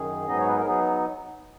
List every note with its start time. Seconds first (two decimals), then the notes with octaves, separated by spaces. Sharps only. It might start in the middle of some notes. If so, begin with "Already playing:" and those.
Already playing: F#2 D#3 G#4
0.26 G#2 F#3 B3 D#4 D#5
0.39 C#5
0.48 B4
0.56 A#4
0.65 F#3 B3 D#4 G#4